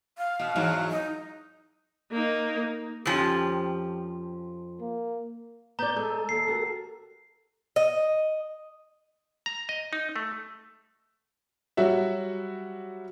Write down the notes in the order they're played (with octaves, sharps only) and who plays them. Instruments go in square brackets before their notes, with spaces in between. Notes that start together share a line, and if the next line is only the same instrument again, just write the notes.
[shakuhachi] F5
[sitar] B2
E2 G#2 F#3
[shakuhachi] D#4
[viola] A#3 D#4
[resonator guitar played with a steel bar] F2 F3 C#4 [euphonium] G4
[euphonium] A#3
[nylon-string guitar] B3 D5 [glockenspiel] A#5 [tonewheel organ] G6
[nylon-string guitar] G#3 [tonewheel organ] A4
[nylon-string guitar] D#2 [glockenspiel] C7
[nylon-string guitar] F#4 G4 A#4
[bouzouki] D#5
[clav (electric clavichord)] A#5
D#5
D#4
A3
[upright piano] F#3 G3 F#4 E5